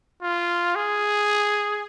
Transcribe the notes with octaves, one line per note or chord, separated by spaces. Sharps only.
F4
G#4